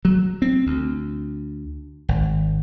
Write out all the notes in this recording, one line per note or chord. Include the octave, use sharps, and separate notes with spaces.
F#3
C4
D2
G#1